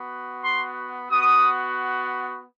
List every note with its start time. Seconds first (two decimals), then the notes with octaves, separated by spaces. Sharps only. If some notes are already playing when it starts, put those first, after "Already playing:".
Already playing: B3 F#4
0.43 C6
1.10 B3 F#4 D#6